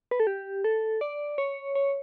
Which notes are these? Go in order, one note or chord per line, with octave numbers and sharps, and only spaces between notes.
B4
A4
G4
A4
D5
C#5
C#5